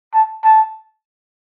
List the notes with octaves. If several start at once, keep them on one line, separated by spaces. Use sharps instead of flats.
A5
A5